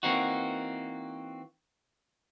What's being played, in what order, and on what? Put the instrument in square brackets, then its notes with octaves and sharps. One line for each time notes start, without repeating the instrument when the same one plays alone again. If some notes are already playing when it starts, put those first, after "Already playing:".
[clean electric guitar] E3 A#3 C4 D#4 F#4